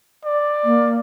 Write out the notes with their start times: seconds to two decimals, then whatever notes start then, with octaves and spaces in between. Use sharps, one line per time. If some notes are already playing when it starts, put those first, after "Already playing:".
0.25 D5
0.64 A#3